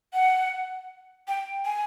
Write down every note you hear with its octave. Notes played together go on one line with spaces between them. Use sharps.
F#5
G5
G#5